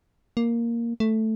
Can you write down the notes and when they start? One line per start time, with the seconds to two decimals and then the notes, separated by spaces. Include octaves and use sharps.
0.37 A#3
1.00 A3